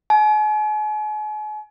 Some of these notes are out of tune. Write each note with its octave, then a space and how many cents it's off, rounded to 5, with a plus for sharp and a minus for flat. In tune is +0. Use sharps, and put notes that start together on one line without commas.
G#5 +40